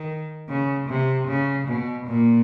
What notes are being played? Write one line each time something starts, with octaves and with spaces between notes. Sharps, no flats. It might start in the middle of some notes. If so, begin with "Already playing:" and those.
Already playing: D#3
C#3
C3
C#3
B2
A#2